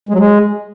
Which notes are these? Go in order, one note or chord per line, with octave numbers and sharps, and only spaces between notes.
G#3
F#3
G#3